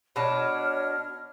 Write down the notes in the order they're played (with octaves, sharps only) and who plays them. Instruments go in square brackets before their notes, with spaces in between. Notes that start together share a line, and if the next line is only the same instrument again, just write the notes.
[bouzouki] B2 D4 A5 [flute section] C#5 D#5 F6